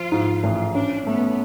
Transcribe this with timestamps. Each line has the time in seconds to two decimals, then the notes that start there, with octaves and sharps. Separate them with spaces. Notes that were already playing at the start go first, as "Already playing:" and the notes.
Already playing: F3 F4
0.12 G#2
0.43 A1
0.74 C#4 D4
1.06 A3 B3